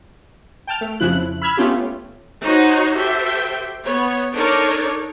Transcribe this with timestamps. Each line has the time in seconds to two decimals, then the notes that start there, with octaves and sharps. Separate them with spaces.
0.67 G5 A5 F6
0.81 A3
1.00 F2 C#3 F3 E4 F#6
1.42 B5 E6 F6 G#6
1.57 A3 B3 C#4 F4 G4
2.43 D#4 F#4 C5 C#5
2.92 F#4 G4 A4 C5 E5 G5
3.84 B3 C#5
4.35 D4 D#4 A4 A#4 C#5 D5